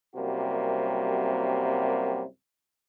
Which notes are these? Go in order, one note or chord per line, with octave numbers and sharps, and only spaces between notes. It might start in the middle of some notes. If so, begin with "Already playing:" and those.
C2 F#2 C3 G3 A#3 F#4